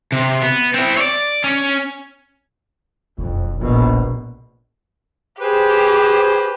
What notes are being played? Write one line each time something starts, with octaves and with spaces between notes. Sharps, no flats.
C3
B3
C4 E4
C#5 D5
C#4
E1 F2
A#1 B2
G4 G#4 B4 C5